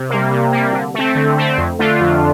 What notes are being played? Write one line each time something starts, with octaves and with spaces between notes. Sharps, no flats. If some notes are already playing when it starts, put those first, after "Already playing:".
Already playing: C3
G3 A#3
C3
G3 A#3
D3
A3 C4
D3
A3 C4
F2
D3 A3 D4 F4
F2